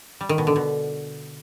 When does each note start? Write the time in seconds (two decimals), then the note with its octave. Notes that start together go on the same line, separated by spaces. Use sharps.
0.21 G3
0.29 D#3
0.38 B2
0.47 D3
0.56 B2